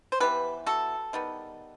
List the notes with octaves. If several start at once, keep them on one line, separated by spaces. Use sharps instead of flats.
C5
E3 B3 G4 B4
F#4 A4
D#3 G3 B3